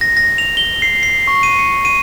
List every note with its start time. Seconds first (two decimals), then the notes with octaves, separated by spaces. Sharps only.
0.01 A#6
0.17 A#6
0.38 F7
0.57 G7
0.82 C7
1.03 C7
1.27 C#6
1.43 D#7
1.58 C#7
1.85 D#7